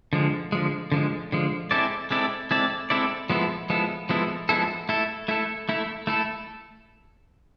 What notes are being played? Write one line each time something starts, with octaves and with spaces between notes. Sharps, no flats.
D3 F3 G#3
D3 F3 G#3
D3 F3 G#3
D3 F3 G#3
G#3 C4 E4 A4 D5
G#3 C4 E4 A4 D5
G#3 C4 E4 A4 D5
G#3 C4 E4 A4 D5
F3 G#3 B3 E4 A4
F3 G#3 B3 E4 A4
F3 G#3 B3 E4 A4
F3 G#3 B3 E4 A4
A3 E4 A4
A3 E4 A4
A3 E4 A4
A3 E4 A4